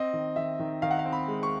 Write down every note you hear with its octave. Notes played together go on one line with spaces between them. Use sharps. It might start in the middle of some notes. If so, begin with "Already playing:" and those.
Already playing: C4 D#5
D#3
D#3 E5
D#3
D#3 F5
F#5
F5
C4
B5
G#3
C#6